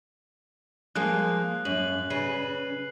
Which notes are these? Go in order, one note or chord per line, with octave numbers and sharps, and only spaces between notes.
F3 G#3 A#3 F#6
F#2 F#7
C#3 B4 C7